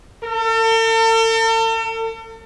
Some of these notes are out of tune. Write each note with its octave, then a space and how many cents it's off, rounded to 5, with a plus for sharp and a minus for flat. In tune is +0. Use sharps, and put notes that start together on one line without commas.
A4 +45